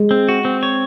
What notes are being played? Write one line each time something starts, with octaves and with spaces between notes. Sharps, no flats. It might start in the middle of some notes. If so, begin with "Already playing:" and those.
Already playing: G#3
C4
F#4
C4
C#5